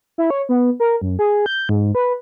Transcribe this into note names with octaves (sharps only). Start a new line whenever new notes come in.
E4
C#5
B3
A#4
F#2
G#4
G6
G#2
B4